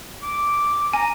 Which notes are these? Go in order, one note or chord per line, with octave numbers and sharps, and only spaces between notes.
D6
G#5 A#5